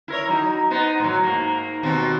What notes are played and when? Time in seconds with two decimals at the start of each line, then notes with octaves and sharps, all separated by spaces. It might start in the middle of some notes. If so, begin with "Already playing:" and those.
0.08 E4 A#4 C#5
0.29 F#3 D#4
0.71 B3 D#4 C5
1.00 A2 F#3
1.23 G#2 A#3
1.83 D#2 B2 C4